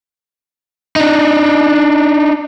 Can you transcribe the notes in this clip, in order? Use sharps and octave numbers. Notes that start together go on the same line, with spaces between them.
D4 D#4